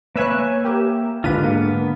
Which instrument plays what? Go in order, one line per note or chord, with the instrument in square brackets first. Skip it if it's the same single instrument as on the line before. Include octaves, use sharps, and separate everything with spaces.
[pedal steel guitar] A#3 E5 G#5 [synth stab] B4 C#5 F#6
[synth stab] G4 A#4
[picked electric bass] G#2 D3 [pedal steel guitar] F4 B4 [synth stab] D#7
[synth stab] A#3 [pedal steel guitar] B3